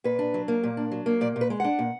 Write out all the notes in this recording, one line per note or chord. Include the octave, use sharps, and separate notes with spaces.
A#2 B4
D4
F#3
A#3
A#2
D4
F#3
A#3
A#2 D5
A#2
B4
G#3
D4 F#5
A#2